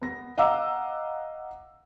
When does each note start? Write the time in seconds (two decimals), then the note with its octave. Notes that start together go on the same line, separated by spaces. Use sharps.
0.01 B3 A#6
0.37 D#5 F5 F#5 A#5 D6 E6